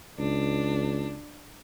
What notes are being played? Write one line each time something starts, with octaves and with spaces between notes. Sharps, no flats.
C#2 D4